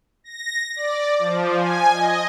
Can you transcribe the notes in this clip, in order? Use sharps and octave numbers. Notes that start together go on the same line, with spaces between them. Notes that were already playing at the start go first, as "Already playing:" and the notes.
A#6
D5
F3
G#5
D#5